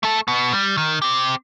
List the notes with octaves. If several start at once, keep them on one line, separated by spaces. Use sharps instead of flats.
A3 A4
B2 B3
G3
D#3
C4 G4